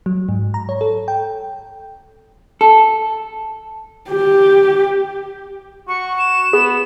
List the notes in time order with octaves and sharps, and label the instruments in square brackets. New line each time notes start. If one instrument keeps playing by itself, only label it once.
[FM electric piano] F#3
G#2
A#5
C#5
A4
G5
[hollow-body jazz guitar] A4
[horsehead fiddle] G4
[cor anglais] F#4 [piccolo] C#6
[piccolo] E7
[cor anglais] B3 [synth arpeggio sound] G#4